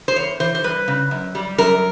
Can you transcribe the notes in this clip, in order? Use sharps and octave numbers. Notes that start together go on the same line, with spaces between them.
C5
E2 C#5
E3 C5
C5
G3 B4
C#3
F#2
G3
F#2 A#4